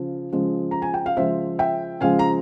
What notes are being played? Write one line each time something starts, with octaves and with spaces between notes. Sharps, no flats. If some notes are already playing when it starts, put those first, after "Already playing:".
Already playing: C#3 F3
C#3 F3 G#3
A#5
G#5
G5
F5
C#3 F3 G#3 C5 E5
E5 G5
C#3 F3 G#3 F5 G#5
A#5